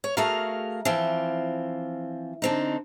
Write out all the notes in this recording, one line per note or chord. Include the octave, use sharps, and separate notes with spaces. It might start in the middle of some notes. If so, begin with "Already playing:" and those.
C#5
A3 F#4 G#4 A#4 F5
E3 F3 C4 F4
D3 C4 D#4